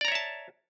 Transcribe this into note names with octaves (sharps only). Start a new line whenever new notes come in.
C#5 D5 E5 A5 A#5